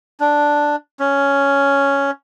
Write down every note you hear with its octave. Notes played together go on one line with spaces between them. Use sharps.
D4
C#4